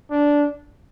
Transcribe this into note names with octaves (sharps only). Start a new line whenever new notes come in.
D4